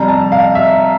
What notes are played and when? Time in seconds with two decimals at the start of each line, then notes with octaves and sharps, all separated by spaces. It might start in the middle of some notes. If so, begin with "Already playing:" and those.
Already playing: F2 C3 G3 A#5
0.08 A5
0.32 F5
0.55 E5